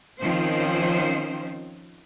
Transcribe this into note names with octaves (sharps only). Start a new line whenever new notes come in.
D#3 F3 C4 C#4 C5